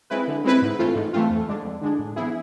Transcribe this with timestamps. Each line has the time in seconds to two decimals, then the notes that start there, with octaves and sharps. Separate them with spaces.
0.10 G#3 C4 E4 B4
0.28 D3
0.44 G#3 C4 E4 B4
0.62 G#2
0.79 E3 A3 C4 F4
0.96 G#2
1.13 E3 A3 C4 F4
1.30 F2
1.48 D3 G#3 D4
1.64 F2
1.82 D3 G#3 D4
1.99 A2
2.16 E3 B3 E4 G#4